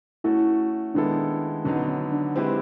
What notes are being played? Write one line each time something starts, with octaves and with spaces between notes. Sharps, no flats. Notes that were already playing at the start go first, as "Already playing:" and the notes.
A3 C#4 E4 F#4 A4
D#3 G#3 B3 D4 E4 A4
D3 F#3 B3 C#4 D#4
C#4
D4
G#3 C4 E4 G4 B4